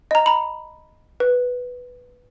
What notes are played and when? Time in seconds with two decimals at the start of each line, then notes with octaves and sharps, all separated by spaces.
0.11 D#5 A#5
0.26 A#5 B5
1.20 B4